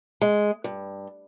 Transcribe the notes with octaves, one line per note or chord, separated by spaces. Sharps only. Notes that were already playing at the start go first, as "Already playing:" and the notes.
G#3
G2